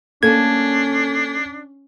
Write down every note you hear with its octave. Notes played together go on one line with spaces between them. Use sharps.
A#3 C#4 D4 A4 G#6